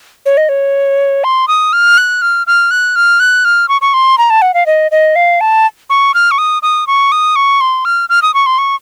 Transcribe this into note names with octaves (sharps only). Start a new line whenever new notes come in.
C#5
D#5
C#5
C6
D#6
F6
F#6
F6
F6
F#6
F6
F#6
F6
C#6
C#6
C6
A#5
A5
F#5
F5
D#5
D#5
F5
A5
C#6
F6
C#6
D#6
D#6
C#6
D#6
C#6
C6
F6
F6
D#6
C#6
C6
C#6